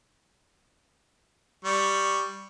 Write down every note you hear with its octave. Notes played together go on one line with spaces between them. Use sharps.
G3 C#6